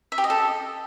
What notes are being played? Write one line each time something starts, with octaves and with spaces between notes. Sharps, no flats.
E5
G4
D#5
A4